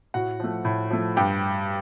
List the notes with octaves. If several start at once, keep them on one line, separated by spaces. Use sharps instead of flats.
A2 F#4 F#5
F3 A3
A2
F3 A3
G2 G4 G5